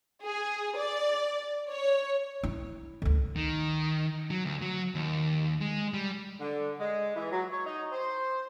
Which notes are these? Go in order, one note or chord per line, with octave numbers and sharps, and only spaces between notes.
G#4
D5
C#5
E4
D2 D3
D#3
F#3
D2
F#3
D#2
G#3
G3
D3
G#3
E3
F#3
C#5
D#4
C5